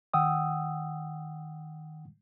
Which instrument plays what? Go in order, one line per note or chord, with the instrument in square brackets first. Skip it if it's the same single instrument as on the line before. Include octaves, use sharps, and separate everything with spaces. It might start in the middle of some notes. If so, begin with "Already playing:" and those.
[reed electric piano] D#3 F#5 G5 D#6 E6